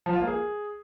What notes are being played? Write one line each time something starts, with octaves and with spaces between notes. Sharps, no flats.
F3
F4
A#3
G#4